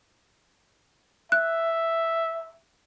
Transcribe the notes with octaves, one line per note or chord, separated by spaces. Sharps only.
E5 F#6